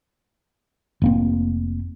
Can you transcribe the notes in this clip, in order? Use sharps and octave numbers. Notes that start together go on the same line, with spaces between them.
F1 A#3 C4